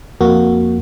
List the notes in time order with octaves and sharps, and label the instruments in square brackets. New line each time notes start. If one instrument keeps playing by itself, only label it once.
[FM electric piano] F2 A#3 F#4